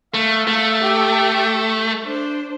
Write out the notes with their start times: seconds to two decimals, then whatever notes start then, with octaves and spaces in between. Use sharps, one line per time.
0.14 A3 F5
0.48 A3
0.80 G4 A4
2.04 D4 C5